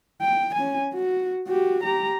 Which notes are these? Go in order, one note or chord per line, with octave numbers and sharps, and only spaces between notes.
G5
C#4 G#5
F#4
F#4 G4
G4 A#5